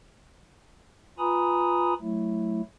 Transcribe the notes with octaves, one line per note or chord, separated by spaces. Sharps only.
F4 B4 G#5 A#5 B5 D#6
F#3 A3 E4